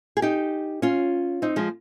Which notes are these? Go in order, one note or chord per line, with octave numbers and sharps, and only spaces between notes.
G#4
D#4 G4
C#4 F4
C4 D#4
F3 G#3